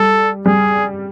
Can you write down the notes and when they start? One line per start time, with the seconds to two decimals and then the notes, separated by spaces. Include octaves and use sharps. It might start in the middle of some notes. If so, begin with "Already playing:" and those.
Already playing: G3 A4
0.46 G3 G#4